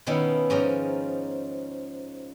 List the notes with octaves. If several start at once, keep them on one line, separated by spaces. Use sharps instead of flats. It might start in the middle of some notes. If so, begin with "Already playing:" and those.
B2 D#3 B3 C#4 D#4 E4
G#2 F3 C#4 A#4 D#5 A#5